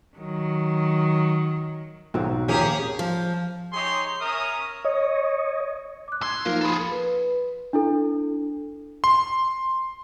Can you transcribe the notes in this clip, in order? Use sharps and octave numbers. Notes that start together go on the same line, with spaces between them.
D#3 F#3
B1 G#2 F#3 C4
A#1 D#2 A#3 C#4 G4 G#4 C5
F3
D#4 G4 G#4 C#5 C6
C#4 A#4 E5 A#5 D#6
C#5 D#5
D6 F#6
C#2 C6 E6 G#6
F3 A#3 D#4 A#4 F5
G#4 A4 F5 B5 C6
B4
D4 E4 A4
C6